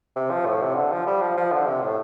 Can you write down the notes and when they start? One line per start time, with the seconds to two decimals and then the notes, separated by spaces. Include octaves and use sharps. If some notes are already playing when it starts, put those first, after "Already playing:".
0.16 C3
0.31 F3
0.46 A2
0.62 C3
0.76 D3
0.92 F3
1.07 G3
1.21 F3
1.37 F3
1.52 D3
1.67 C3
1.82 A2